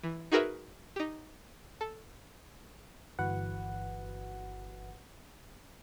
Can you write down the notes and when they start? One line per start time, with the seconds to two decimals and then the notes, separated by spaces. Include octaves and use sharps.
0.03 E3
0.32 D#4 F#4 G#4 A#4 B4 E5
0.96 D#4 G4
1.81 A4
3.19 G1 E3 F#4 B4 F#5